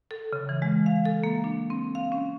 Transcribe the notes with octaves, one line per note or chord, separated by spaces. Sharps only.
A4
C#3
E3
G#3
F5
A4
A#3
D4
C4
F5
C#4